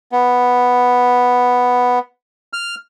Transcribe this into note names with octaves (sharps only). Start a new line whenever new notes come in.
B3
F6